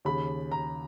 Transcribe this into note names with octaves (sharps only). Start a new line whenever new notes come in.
D#2 C#3 B5
A#5